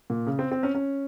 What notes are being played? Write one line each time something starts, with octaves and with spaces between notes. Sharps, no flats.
A#2
C#3
C4
C4
C#4
C#4